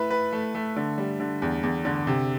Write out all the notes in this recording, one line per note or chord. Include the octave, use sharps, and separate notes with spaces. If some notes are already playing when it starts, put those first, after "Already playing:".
Already playing: A3 E4 B4
B4
A3
A3
D3
G3
D3
E2
E2
D3
C3